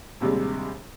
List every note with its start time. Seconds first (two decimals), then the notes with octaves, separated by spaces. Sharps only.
0.20 A#1 D#2 C3 G3 G#3